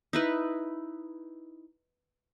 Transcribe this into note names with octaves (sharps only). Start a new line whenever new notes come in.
D#4 E4 B4